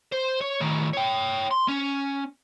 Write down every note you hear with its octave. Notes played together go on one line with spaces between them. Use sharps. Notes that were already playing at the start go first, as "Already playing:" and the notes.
C5
C#5
A2 D#3
C#5 G5
C6
C#4